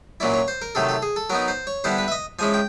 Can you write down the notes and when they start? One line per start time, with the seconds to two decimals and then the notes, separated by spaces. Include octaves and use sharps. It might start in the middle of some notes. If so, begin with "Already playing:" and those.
0.20 A#2 F#3 A#3 C#4 E4 D5
0.34 C#5
0.48 C5
0.62 A#4
0.75 C3 D#3 F#3 A3 A4
0.89 A4
1.02 G#4
1.16 A4
1.30 F#3 B3 D#4 A#4
1.48 C5
1.67 C#5
1.84 D3 G3 B3 E4 C5
1.98 B4
2.08 E5
2.12 D#5
2.39 F3 G#3 C#4 E4 G#5
2.54 G5